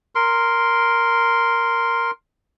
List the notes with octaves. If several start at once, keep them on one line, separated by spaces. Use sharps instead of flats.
A#4 C6